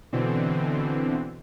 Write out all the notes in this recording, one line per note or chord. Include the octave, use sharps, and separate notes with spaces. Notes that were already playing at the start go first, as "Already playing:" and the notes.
B2 D3 E3 C4